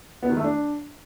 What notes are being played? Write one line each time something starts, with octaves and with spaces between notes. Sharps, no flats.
B3
D#3
A3
D4